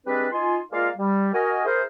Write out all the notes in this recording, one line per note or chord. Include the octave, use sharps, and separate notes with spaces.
G3 G#3 C4 D4 G#4 B4
D#4 F4 G#5 C6
G#3 A#3 F4 A#4 D5 F5
G3
F#4 A#4 D#5 G#5
E4 G#4 A#4 C5